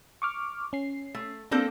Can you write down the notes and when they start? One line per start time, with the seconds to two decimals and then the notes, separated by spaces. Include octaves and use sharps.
0.22 C#6 D6 F6
0.73 C#4 C7
1.15 A3
1.51 A#3 C4 D4 A4 G6